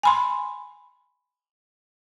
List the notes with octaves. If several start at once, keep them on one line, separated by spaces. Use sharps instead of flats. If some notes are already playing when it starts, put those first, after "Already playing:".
G#5 B5 C6